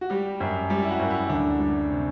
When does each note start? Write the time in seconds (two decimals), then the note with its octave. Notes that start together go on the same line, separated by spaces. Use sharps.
0.01 F#4
0.10 G3 G4
0.40 F#2
0.70 G3 G4
0.83 E4
0.90 F#4
0.99 F#2
1.10 E4
1.30 D2 D4
1.60 G3
1.90 C3